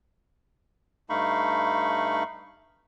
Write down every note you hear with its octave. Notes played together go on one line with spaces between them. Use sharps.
G2 A3 D#4 F5 B5 C#6